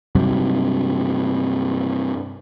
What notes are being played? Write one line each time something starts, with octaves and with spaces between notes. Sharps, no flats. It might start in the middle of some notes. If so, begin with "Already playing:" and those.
G2 C3 F#3